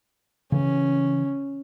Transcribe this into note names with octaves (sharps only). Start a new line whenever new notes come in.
C#3 E3 C#4